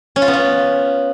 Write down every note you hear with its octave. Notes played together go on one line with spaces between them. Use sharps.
C#4
F4
B3
F4